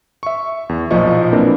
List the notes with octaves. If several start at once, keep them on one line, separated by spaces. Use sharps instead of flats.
E5 C#6
E2
B1 A#2 F3 D#5 C#6
A#3 C4 D4 E4 A#4 B4